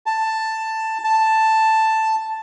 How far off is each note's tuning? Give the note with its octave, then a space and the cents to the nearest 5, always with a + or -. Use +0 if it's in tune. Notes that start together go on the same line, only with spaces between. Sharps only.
A5 +10
A5 +5